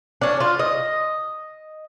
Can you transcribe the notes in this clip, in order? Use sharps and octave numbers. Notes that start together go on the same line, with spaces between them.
C#4 D4
F4
D#5